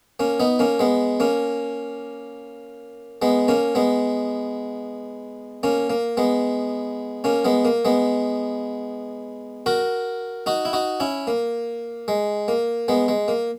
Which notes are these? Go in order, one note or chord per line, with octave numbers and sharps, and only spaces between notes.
A#3 C#4
B3 D#4
A#3 C#4
G#3 B3
A#3 C#4
G#3 B3
A#3 C#4
G#3 B3
A#3 C#4
A#3
G#3 B3
A#3 C#4
G#3 B3
A#3
G#3 B3
F#4 A#4
D#4 F#4
E4
D#4 F#4
C#4 E4
A#3
G#3
A#3
G#3 B3
G#3
A#3